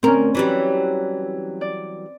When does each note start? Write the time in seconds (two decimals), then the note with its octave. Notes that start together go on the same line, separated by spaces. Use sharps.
0.03 D2 C4 C#4 A#4
0.35 E3 F#3 G3
1.61 D5